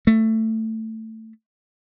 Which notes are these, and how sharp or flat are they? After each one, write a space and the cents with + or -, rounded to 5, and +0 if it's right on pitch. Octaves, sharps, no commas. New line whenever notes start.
A3 +15